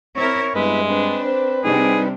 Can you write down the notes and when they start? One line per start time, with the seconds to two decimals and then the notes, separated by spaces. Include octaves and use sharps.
0.16 C4 E4 A#4 C#5
0.55 G2 G#3 B3 E4 B4
0.89 C4 D4 B4
1.23 C5
1.64 C3 G3 D4 D#4 G#4